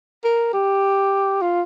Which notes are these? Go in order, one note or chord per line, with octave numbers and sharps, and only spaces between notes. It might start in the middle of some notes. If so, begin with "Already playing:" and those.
A#4
G4
F4